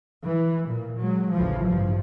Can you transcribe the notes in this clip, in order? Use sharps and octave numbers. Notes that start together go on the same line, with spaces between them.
E3
A#2
F#3 G#3
A1 D2 C#3 E3 F3
G2 F3